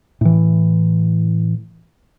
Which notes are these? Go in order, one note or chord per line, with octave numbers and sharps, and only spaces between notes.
A2 E3